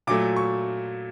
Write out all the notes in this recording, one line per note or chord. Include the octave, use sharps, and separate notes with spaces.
A#2 F#3 A3 D6
C#6